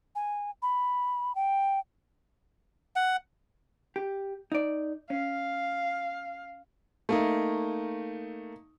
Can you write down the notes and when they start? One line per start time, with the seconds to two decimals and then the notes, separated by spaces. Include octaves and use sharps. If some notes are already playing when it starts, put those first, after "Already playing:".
0.15 G#5
0.62 B5
1.35 G5
2.96 F#5
3.96 G4
4.52 D#4 D5
5.10 C#4 F5
7.09 A3 A#3 D#4